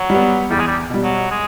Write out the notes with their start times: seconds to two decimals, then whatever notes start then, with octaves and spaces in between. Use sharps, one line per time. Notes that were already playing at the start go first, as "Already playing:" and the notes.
Already playing: F#3
0.10 G3 B3
0.50 E2 G3
0.59 G#3
0.67 G3
0.90 B2 G3
1.04 F#3
1.31 G#3